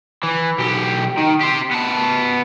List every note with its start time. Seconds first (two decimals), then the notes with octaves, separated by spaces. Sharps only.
0.23 E3
0.58 B1 G4
1.17 D#3
1.40 G4 C5
1.71 B3 A5